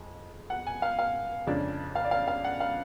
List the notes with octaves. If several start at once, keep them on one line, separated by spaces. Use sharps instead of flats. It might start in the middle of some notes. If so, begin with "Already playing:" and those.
Already playing: F2 G#3
F#5
G#5
F5
F5
F2 C#3 G#3 D4
F5
D5
F5
F5
F#5
F5